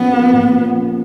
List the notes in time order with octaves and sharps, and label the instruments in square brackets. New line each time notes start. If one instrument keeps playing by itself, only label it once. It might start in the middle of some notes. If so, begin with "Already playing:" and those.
Already playing: [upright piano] A#2 F3 C#4 [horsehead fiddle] B3
[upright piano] A#3
A#2
F3
C#4